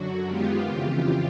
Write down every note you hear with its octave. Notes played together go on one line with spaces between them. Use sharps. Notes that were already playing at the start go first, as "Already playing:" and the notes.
Already playing: F#2 D3 F#3 F#4
F#2 D#3 G#3 B3 F4 G4
F2 C#3 E3